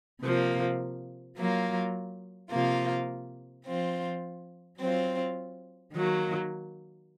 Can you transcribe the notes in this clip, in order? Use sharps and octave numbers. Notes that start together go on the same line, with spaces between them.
C3 F3 A#3
F#3 A#3 F4
C3 F3 A#3 F4
F3 C4 F4
F#3 C4 F4
D#3 F#3 A#3